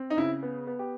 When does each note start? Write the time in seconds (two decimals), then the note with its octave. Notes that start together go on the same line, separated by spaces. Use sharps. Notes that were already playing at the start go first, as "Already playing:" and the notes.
Already playing: C4
0.10 D#4
0.17 C#3 E4
0.43 B3
0.67 B3
0.79 G4